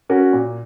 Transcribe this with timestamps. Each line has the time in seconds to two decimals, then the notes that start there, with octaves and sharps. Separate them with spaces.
0.09 C#4 F#4 A#4
0.33 A#2